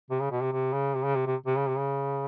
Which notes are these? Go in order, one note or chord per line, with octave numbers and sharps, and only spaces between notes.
C3
C#3
B2
C3
C3
C#3
C3
C#3
C3
C3
C3
C#3
C3
C#3